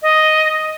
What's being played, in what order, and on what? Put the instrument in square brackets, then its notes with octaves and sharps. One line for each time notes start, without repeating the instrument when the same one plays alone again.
[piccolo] D#5